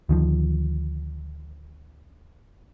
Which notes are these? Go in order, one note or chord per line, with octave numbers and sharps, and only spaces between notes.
D2 D#3 F3